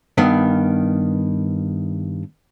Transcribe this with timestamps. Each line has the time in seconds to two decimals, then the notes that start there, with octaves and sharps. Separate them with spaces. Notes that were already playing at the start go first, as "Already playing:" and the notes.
0.18 G2 D#3 B3